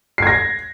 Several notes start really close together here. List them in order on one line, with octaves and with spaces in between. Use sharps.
C7 G#6 A#6